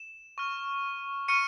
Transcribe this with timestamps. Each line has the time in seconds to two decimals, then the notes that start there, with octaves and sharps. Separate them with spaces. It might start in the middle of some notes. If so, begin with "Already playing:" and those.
Already playing: E7
0.38 C#6 F6
1.28 C#6 F6 C#7 D#7